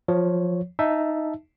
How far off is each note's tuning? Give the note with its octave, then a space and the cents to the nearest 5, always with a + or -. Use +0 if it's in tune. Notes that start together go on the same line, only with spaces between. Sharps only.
F3 +15 C#5 +0
D#4 +0 E5 +5 A5 -5